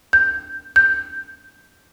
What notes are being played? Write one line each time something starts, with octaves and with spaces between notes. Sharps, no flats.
G6
G6